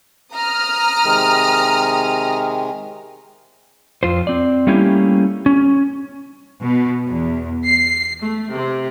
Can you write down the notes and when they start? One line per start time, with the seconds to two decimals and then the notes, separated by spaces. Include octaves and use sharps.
0.32 A#5 D#6 F6
1.05 C3 D#3 G#3
4.03 F2 F4 C5
4.27 C4 D5
4.67 G3 A3 A#3 C#4 E4 G4
5.46 C#4
6.63 B2
7.07 E2
7.63 C7
8.21 A3
8.51 C3